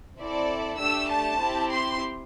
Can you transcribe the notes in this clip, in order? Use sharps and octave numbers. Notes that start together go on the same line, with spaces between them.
C4 E4 A4 D5
A3 D4 G4 E6
A5
C4 E4 G4
C6